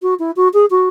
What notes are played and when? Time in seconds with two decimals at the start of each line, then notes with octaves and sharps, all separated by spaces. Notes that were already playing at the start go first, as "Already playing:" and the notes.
0.02 F#4
0.19 E4
0.36 F#4
0.53 G#4
0.70 F#4